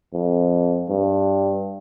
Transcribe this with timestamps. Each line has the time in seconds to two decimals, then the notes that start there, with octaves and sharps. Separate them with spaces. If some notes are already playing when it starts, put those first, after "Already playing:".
0.14 F2
0.89 G2